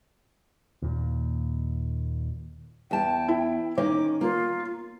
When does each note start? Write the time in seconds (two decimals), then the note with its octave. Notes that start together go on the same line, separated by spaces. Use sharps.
0.82 D#2 A#2
2.91 E2 G5 A5
3.28 E4
3.78 D#3 A#3 C#4 C#5 D6
4.21 A#3 F4